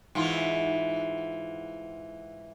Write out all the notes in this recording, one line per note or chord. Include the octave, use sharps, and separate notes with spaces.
G#2 E3 F4